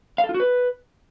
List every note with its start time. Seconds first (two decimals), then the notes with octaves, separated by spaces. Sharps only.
0.18 F5
0.24 A4
0.29 F4
0.34 F#4
0.40 B4